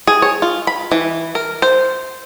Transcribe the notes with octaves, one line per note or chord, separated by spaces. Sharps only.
G#4
C#5
F4
B5
E3
A#4
C5